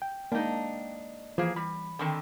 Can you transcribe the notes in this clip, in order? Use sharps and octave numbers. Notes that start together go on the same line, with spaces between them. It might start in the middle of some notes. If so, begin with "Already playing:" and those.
G5
G#3 A#3 D4 D#4
E3 F3 A#3 G#4
G3 B5
D3 D#3 C4